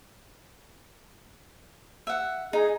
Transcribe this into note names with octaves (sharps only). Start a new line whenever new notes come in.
E5 F#5
D#4 G#4